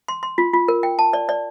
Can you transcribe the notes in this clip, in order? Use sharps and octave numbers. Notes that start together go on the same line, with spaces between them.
C6
C6
F4
F4
A#4
G5
A5
D5
D5